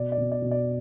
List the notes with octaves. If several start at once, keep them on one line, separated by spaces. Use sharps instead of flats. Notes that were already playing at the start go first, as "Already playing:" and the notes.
Already playing: B2 D5
D5
B2
D5
B2
D5